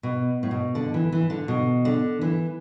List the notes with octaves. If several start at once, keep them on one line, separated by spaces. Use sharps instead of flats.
B2
A2
B2
D3
E3
E3
D3
B2
D3
E3